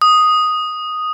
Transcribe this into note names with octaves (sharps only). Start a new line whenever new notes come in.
D#6